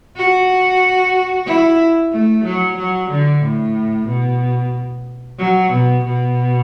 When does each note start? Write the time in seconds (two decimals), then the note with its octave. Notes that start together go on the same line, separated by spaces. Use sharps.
0.16 F#4
1.46 E4
2.12 A3
2.44 F#3
2.77 F#3
3.11 D3
3.43 A2
4.08 B2
5.39 F#3
5.72 B2
6.05 B2